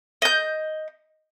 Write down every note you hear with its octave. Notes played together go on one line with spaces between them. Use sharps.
D#5 G6